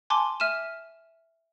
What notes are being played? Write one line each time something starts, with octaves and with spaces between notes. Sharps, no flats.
G#5 A5 C6 D6
E5 F6 D#7 E7